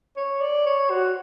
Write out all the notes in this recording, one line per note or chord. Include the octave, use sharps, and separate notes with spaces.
C#5
D5
C#5
F#4